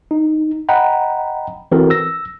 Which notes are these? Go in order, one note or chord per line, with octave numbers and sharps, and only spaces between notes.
D#4
D#5 F#5 G5 A#5 B5
E3 C4 F#4 A4 A#4
E6 A#6